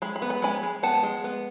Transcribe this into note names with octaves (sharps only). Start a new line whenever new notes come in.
G#3 B5
B5
B3
B5
G#3 G#5 B5
G#3
B3 F#5 A5
G#3
B3